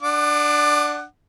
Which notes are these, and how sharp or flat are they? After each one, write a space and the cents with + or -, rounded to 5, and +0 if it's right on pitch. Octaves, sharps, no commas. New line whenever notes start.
D4 +0 F#5 +5 D6 +35